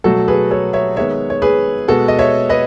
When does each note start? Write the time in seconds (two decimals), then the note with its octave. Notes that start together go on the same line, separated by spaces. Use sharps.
0.04 B2 F#3 A3 F#4 A4
0.28 G#4 B4
0.51 A4 C#5
0.73 C#5 E5
0.96 D#3 G#3 B3 C#5 E5
1.30 C#5
1.42 G#4 B4
1.88 B2 G#3 B3 F#4 A4
2.08 D#5
2.19 C#5 E5
2.49 B4 D#5